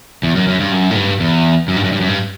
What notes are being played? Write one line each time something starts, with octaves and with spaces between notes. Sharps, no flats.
E2
F#2
F#2
G2
F#2
A2
G2
E2
F#2
G2
F#2
G2
F#2
G2